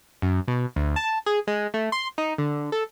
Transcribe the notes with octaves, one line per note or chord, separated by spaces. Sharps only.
F#2
B2
D2
A5
G#4
G#3
A3
C6
D#4
D3
A4